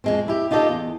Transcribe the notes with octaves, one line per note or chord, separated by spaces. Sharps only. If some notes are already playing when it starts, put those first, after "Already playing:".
F2 G#3 C4
E4 G4
D#4 F4 G4 A4 D5 D#5
E2